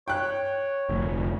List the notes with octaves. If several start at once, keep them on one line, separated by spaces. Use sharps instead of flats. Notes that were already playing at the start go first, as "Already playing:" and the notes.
C#5 G5 F#6
F1 D2